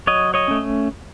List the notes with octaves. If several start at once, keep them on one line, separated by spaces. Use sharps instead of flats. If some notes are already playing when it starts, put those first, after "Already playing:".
F#3 C#5 D#5
C#5 D#5
A3 C#4